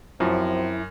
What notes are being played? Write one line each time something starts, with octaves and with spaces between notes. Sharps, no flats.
F#2 F3 F#3 C4 E4